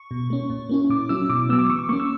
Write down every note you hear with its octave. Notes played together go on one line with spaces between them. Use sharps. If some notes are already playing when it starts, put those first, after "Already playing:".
Already playing: C#6
B2
A#3 C#4
A#2
A#3 C#4 E4
A#2 D6
F#3 C#4 E4 E6
B2 D6
F#3 B3 E6
D6
E3 C#6
D6
A#3 C#4 C#6
E6